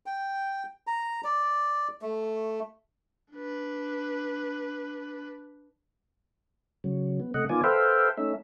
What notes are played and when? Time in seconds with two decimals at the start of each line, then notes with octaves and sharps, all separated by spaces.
0.06 G5
0.87 A#5
1.24 D5
2.02 A3
3.34 D4 B4
6.84 C#3 F#3
7.20 B3
7.34 C3 A3 D#5 F#5
7.49 D#3 B3 F4 D5 G#5
7.64 A4 B4 C5 E5 F5 G5
8.17 A3 C#4 D#4 E5